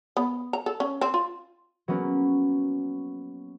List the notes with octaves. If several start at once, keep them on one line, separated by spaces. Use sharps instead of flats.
B3
A#5
A4
C#4
C4
F4
F#3 A#3 B3 C#4